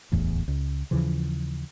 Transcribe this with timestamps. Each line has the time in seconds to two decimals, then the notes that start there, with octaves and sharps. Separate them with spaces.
0.12 D1 A1 E2 A2
0.48 C#2
0.91 D#2 C#3 E3 F3